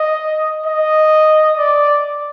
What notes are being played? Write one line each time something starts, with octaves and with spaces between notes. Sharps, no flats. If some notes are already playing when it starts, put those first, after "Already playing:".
Already playing: D#5
D#5
D5